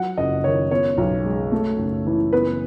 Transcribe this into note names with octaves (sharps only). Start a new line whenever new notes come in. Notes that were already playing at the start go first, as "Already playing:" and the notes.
Already playing: F#3 F#5
F#1 D#5
D#3 C#5
B3 C#5
B1
G#3
A3
F#1
E3
B3 B4